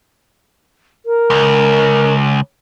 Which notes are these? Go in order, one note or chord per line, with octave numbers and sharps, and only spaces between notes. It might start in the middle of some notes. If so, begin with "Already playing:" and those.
A#4
C#2